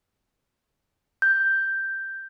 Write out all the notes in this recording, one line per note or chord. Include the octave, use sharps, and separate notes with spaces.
G6